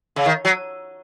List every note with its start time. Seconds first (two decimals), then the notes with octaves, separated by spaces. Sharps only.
0.16 C#3
0.26 D#3
0.45 F#3